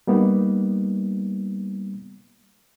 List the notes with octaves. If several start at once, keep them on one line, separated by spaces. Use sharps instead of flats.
G3 A#3 B3 D#4